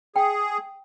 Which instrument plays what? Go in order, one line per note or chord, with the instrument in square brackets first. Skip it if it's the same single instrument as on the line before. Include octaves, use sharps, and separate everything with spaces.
[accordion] G#4 [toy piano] G5